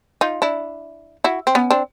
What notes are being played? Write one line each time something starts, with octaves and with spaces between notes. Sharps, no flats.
D#4 F4
D4 E4
E4 F#4
C4
B3 C#4
C4 D4